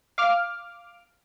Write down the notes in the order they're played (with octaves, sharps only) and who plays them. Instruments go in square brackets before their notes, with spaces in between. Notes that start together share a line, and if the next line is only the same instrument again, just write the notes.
[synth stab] F5 D6 F6